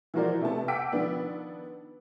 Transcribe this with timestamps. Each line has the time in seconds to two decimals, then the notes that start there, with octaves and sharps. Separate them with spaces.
0.14 E3 F3 F#4 A#4 C5 D5
0.41 C3 A3 B3 A5
0.68 F#5 G5 D6 E6 B6 D7
0.92 D#3 F3 B3 D4